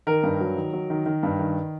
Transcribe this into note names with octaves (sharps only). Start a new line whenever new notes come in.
D#3 A#4
G2
F#3
D#3
F#3
D#3
D#3
G2
D#3